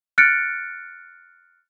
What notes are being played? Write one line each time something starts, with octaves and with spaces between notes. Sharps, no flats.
F6 F#6 A6 C#7 D7